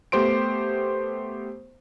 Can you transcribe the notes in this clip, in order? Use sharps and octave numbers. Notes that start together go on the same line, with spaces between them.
A3 B3 G4 C5 C6 D7